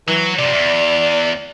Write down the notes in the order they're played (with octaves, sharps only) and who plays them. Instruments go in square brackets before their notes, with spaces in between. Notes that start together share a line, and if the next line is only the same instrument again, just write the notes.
[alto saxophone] E3 [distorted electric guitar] F#3
[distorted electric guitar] F2 C3 [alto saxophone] D5
[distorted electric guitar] E2